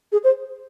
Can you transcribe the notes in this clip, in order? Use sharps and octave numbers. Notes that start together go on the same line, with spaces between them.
G#4
C5